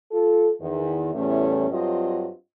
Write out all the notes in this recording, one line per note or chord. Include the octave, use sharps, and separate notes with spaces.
F4 A4
E2 D#3
E2 A2 G3 A3 C#4
G2 F#3 C4 F4 D#5